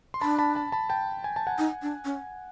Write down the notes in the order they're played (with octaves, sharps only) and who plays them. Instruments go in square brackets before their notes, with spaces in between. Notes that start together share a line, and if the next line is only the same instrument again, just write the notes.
[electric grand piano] C6
[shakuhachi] D4 [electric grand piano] A5 B5
[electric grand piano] A5 B5
A5 B5
A5 B5
G5 A5
G#5
A5
F#5 G#5
[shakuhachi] D#4
D4
C#4